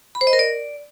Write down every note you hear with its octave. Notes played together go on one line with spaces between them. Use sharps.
B5
C5
D#5
A#4
D5